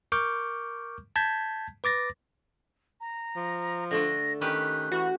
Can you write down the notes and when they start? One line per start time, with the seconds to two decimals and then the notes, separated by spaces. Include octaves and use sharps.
0.12 A#4 C#6 D6 F6 G6
1.16 A5 G6 G#6 B6
1.84 B4 D6 A6 A#6
3.01 A#5
3.36 F3
3.91 D3 A3 D4 A#6
4.41 D#3 C#4 G4 B4 F#6
4.92 E3 F#4